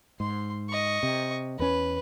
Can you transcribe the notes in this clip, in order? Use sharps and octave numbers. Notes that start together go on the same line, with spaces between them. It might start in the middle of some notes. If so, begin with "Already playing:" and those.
G#2 C6
D#5 C#6
C3
E2 C#4 B4